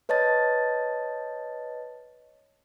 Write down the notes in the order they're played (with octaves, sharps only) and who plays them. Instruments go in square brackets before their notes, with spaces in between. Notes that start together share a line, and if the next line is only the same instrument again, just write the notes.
[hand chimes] B4 C#5 D#5 A5 A6